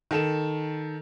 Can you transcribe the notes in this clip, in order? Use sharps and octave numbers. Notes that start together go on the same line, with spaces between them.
D#3 A4 E7